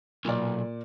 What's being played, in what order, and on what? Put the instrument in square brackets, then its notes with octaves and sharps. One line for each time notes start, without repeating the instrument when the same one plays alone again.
[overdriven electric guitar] B1 [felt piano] A#2 D5